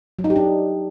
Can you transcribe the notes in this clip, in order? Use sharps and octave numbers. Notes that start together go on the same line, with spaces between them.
F#3
D#4
G4
D4